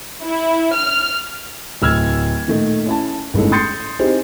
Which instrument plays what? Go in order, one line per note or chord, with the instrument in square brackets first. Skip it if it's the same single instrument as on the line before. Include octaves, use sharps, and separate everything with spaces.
[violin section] E4
F6
[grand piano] D1 E6 F6 G#6
A#2 D#3 A3 D#4
C#4 E4 A5
G1 A2 D#3 G#3 C#4 A4
C6 D#6 G6 A6 C7 C#7
C4 D#4 E4 G4 G#4